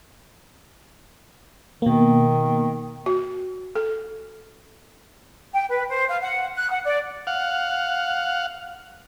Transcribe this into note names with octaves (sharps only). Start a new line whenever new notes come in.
B2 D#3 A#3
F#4
A4
G5
B4
C5
F5
F#5
F#6
F#5
D5
F5 F#5